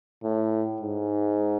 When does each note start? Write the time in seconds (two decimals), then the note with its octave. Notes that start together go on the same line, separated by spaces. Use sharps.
0.23 A2
0.81 G#2